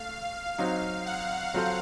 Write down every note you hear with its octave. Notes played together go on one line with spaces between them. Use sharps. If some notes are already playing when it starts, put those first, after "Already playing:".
Already playing: A3 F5
F#3 C4 D#4 F5
F#5
F#3 C4 F4 A4 C5